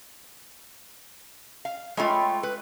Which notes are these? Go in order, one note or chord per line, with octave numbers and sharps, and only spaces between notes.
F5
G#3 A3 F4 C#5 G5 B5
B4